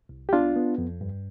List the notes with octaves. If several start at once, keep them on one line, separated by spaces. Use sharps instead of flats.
C2
G4
B3 D4 F4
B3
F2
G2